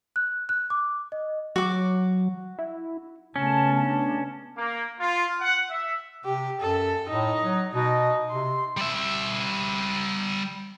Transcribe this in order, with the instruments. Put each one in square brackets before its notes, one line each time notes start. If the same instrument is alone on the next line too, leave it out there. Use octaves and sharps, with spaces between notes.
[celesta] F#6
F#6
D6
D#5
[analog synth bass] F#3 [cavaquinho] F#4 D6
[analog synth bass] E4
[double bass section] C#3 A3 B3 [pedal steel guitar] C#4 [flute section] A5
[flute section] D4 A5
[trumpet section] A#3
F4
F#5
E5
[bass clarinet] C3 [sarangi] G4
[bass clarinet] F#2 [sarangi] A4
[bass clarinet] A2 [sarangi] D#4
[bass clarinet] F#3
[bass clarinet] B2 [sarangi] D#4
[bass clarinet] C3 [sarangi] C6
[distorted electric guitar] G3 E5